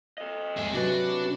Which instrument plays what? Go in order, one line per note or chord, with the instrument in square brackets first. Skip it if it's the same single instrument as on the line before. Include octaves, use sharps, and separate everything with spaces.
[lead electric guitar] A4 D#5
[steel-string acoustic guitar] D#2 G#3 [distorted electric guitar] G#4 E5
[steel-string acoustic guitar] C3 F#3 B4 [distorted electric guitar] D4 [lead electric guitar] F#4